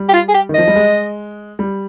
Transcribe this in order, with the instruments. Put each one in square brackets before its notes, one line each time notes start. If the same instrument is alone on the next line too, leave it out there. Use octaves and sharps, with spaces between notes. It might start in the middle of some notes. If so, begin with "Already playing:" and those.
Already playing: [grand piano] G3
[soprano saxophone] G4
F4
G#4
G4
[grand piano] D#3
[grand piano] F3 [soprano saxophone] D#5
[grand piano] G3
G#3
G3